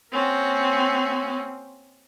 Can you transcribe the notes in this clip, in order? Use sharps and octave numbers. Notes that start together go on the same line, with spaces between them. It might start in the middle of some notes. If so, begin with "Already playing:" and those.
A#3 C4 C#4 F#4